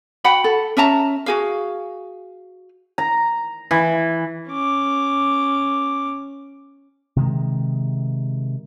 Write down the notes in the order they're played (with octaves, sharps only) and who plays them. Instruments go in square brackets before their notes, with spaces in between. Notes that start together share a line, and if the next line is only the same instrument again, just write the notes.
[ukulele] F#4 F#5 G5 B5
A4
C#4 E5 A5 A#5
F#4 G#4 F5
[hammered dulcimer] A#5
E3
[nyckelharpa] C#4 D6
[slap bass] C3 D#3 G#3